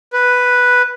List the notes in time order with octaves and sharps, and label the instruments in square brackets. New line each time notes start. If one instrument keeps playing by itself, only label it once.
[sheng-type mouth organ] B4